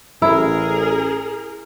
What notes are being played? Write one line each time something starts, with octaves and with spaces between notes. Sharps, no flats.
A1 E4 G#4 A#4